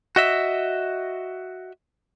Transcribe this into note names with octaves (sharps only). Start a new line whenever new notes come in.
F#4 D#5 E5